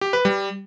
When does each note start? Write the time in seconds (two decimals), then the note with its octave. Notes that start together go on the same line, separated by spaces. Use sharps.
0.01 G4
0.13 B4
0.25 G3